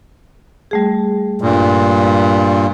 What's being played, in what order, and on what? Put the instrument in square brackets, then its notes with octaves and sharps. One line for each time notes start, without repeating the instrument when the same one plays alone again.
[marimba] G3 A3 G#4
[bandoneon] G2 A#2